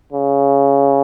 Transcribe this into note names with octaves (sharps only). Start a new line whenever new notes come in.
C#3